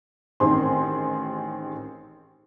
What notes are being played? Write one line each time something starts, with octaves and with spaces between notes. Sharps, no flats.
A1 D#3 C4 G#4 C5 C6